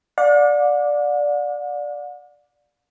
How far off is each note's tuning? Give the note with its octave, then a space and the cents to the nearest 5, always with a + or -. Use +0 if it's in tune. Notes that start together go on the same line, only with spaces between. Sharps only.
D5 +0 F#5 -45